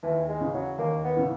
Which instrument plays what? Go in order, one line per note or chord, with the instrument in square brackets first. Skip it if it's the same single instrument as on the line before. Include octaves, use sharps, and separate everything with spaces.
[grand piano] D#2 [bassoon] E3
[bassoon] G#3
[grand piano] C#3 E3
[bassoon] F#3
[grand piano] D#2 [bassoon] A#3
[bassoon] B3
[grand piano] C#3 E3